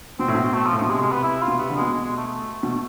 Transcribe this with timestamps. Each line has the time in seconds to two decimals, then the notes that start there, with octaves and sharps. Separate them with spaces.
0.19 B2 C4
0.28 A2
0.35 B2
0.54 A3
0.66 F3
0.73 A2
0.77 B2 F3
0.89 C3 G#3
1.01 G#3
1.12 B3
1.23 E4
1.42 F4
1.48 B2
1.58 C3 B3
1.70 D3
1.76 G#3
1.82 B2
1.93 G#3
2.05 G#3
2.17 A3
2.28 A3
2.63 B2